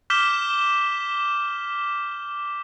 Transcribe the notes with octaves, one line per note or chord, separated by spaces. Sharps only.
D6 F6 G6 B6 E7 G7